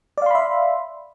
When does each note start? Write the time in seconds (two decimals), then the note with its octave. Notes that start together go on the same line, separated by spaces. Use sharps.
0.18 D5
0.22 F5
0.26 C6
0.31 B5
0.35 E5